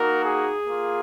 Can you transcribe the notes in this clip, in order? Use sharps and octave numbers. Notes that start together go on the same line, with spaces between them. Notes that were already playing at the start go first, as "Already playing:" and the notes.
Already playing: A#3 D#4 F#4 A#4
G#4
A#3 F4